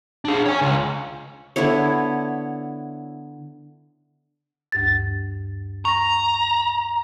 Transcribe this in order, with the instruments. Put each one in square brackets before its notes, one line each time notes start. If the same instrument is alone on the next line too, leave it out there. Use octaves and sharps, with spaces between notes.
[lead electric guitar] D4 G#4
C#5 G#5
C#2
[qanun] D3 B3 E4 C#5
[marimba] D2 G2 A6
[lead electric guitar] A#5 [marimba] C#6 A#6